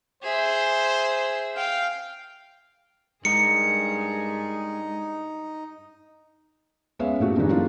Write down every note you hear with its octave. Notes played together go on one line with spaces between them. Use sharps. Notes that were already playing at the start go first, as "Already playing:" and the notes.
G#4 C5 E5
F5 G5
G2 G#3 D#4 G#4 A#4 C#7
G#3 B3 C#4 C#5 E5 F5
A1 A#2 A3 E4 F#4 G4
G2 E3 G#3 D4 D#4 G4
F#3 G3 A#3 C4 D4 F4